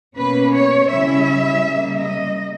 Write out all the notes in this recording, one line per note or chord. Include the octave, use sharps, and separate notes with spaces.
B2 A#3 C#4 B4
C#5
C#3 G3 C#4 E4 E5
C#3 G3 A#3
D#5